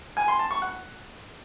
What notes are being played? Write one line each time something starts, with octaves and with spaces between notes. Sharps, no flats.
G#5
C6
A5
C#6
F#5